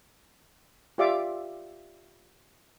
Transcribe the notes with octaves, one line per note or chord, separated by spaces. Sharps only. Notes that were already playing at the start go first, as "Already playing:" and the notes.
F4 G4 D5 E5 F5 D6